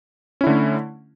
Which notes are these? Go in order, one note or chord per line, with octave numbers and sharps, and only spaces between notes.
D3 A3 C#4 E4